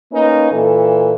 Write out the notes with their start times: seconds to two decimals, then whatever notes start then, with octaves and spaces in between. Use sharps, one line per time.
0.12 A#3 C#4 D#4 A#4 B4
0.52 A#2 E3 A4